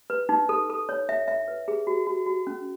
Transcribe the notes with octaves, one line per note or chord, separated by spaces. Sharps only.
B4
D#4
A4
A4
C#5
E5
E5
B4
G#4
F#4
F#4
F#4
C#4